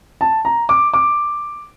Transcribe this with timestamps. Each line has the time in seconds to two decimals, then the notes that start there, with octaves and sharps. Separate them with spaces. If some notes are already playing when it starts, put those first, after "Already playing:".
0.21 A5
0.45 A#5
0.69 D6
0.94 D6